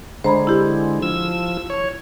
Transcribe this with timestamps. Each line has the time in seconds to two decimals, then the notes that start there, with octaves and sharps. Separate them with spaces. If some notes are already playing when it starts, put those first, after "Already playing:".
0.24 D3 G#3 C5 A#5 B5
0.47 E4 G4
1.02 F3 E6
1.70 C#5